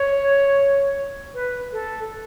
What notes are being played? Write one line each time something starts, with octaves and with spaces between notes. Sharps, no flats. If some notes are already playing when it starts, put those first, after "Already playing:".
Already playing: C#5
B4
A4